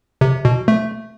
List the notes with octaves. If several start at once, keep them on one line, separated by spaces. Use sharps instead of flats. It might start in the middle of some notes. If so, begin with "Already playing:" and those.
C3
B2
A3